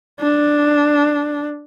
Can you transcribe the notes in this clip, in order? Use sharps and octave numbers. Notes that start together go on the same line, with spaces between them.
D4